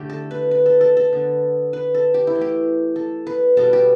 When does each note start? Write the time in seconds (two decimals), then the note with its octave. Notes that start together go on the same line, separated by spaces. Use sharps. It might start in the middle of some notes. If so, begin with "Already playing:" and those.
Already playing: D3 A3 G4
0.10 A4
0.31 B4
0.51 B4
0.66 A4
0.81 A4
0.97 A4
1.13 D3 B3
1.73 B4
1.95 A4
2.14 G4
2.27 E4
2.35 E3 A3
2.41 G4
2.96 A4
3.27 B4
3.57 B2 G3 B3 A4
3.73 G4